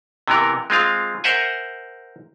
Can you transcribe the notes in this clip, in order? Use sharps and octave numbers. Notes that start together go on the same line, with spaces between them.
C3 E3 B3 A#4
G#3 C4 F4 F5
A#4 C5 E5 F#5 G#5